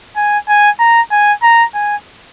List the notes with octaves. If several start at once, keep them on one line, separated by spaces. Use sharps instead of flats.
G#5
G#5
A#5
G#5
A#5
G#5